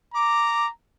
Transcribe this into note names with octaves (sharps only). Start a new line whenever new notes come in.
A#5 D6